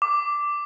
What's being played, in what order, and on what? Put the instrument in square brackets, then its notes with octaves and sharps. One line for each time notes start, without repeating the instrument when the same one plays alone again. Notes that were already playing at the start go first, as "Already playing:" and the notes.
[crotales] D6